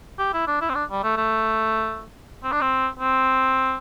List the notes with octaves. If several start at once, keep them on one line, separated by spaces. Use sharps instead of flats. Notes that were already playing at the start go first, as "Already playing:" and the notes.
G4
E4
D4
E4
C4
D4
G3
A3
A3
C4
D4
C4
C4